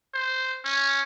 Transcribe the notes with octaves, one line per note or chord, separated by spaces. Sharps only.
C5
C#4